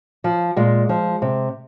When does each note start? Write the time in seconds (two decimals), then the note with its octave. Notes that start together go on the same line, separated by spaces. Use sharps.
0.24 F3
0.56 A#2 G#3
0.89 F3
1.22 C3